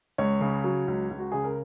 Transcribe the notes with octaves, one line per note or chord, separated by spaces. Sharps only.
C#2 C#5
C#3
F#3
C#2
C#2
F#4
C#3 G#4
A#4